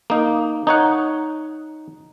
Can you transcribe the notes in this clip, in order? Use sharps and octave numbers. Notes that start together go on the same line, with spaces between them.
A#3 D#4
D#4 C#5 F#5